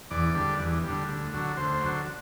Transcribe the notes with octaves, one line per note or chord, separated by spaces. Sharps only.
E2 D5
D3 G3
E2
D3 G3
D2
D3 F#3
D2 C5
D3 F#3